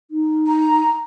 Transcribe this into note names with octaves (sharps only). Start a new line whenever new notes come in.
D#4
A#5